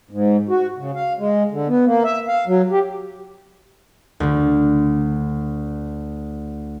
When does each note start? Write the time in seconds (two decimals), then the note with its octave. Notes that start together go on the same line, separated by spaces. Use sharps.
0.11 G#2
0.49 F#4
0.78 C#3
0.95 F5
1.19 G#3
1.51 D3
1.68 B3
1.86 A#3
2.04 E5
2.28 F5
2.47 F#3
2.71 G4
4.20 D2 D3